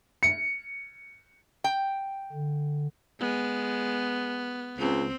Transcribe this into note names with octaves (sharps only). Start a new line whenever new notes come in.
C#7
G5
D3
G#3 B3
C#2 C4